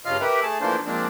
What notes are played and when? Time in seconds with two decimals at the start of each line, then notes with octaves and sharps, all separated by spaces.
0.05 G2 C#3 F4 D#5 F5 F6
0.21 G4 A#4 B4 E5
0.43 A3 G#4 A5
0.61 E3 F3 A3 A#3 D4 C5
0.86 F3 G#3 A#3 C4 D4